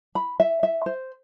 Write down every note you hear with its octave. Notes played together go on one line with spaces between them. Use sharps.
B5
E5
E5
C5